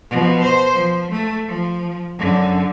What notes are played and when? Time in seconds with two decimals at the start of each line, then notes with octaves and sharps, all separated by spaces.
0.11 B2 F3
0.43 C5
0.74 F3
1.11 A3
1.48 F3
2.19 F#2 D3